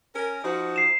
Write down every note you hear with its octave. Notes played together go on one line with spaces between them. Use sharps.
C#4 A#4
F3 D#4 F#4
C7 E7